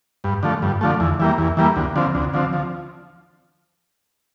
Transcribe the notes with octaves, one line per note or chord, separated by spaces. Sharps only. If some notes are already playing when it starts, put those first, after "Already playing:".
G2
D3 F3 A3
G2
D3 F3 A3
E2
E3 G3 A#3
E2
E3 G3 A#3
D2
D3 F3 C4
D2
D3 F3 C4
F3